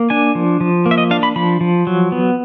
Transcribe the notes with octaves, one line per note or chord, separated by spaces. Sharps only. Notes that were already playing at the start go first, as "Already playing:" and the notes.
Already playing: A#3
D4 G#5
F3
F3
A#3
E5
D#5
D4 F5
B5
F3 B5
F3
F#3
B3